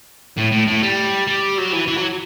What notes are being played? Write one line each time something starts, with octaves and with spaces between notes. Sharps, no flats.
A2
A2
A2
G3
G3
F#3
E3
E3
F#3